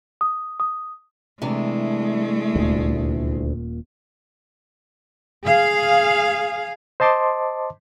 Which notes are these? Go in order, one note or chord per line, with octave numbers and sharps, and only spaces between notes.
D#6
D#6
C3 E3 G#3 A3 D4
D#1 D2 A#2
G#4 F5
C5 D#5 A5 C6 D6